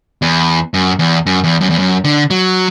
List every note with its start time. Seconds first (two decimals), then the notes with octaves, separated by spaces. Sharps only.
0.22 E2
0.74 F#2
0.99 E2
1.26 F#2
1.44 E2
1.61 F#2
1.70 E2
1.78 F#2
2.04 D3
2.31 F#3